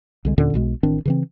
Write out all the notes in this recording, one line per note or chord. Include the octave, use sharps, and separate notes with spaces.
C2 D3 G#3
D#2 A#2 D3 C#4
B1 B2 G#3
A1 D#3 C4 D4
C#3 E3 C4